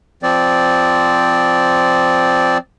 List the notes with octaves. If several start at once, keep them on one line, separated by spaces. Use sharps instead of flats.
F3 C4 D5